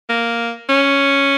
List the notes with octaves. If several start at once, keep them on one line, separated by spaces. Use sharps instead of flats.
A#3
C#4